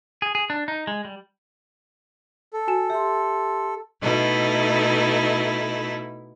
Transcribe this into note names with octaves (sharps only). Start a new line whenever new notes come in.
G#4
G#4
D4
D#4
G#3
G3
A4
F#4 G#5 E7
G4 E5 C6
B2 A3 D#4 E4